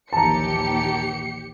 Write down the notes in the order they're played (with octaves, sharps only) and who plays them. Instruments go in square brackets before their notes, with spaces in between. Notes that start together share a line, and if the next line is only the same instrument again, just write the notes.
[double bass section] A#1 D#2 E3 [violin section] G4 C#7 [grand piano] A5 A#5